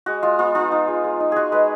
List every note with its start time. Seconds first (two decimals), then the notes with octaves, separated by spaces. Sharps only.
0.06 G#3 F#4
0.23 G#3 F4
0.39 B3 F4
0.55 D#4 F4
0.72 D#4
0.88 G#3
1.04 G#3
1.20 D#4
1.32 G#3 F#4 G#4
1.52 G#3 B4